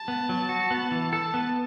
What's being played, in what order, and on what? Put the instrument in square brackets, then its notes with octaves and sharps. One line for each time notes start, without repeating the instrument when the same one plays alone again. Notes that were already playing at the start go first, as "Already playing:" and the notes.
Already playing: [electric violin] A5
[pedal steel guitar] B3
F#3
F#4
B3
E3
[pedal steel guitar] A4 [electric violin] A5
[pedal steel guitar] B3